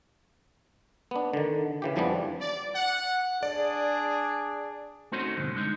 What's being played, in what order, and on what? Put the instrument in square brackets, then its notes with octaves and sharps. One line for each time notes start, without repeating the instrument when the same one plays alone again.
[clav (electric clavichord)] B3 D4
D3 D#3
C#3 E3 G4
F2 E3 F3 G3 B3 D4
[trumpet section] D5
F#5
[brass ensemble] D4 G#4 [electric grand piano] D5
[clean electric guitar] A3 C4 C#4 D#4 F#4 C5
D2 G2 B2 D3
D3 G#3 D#4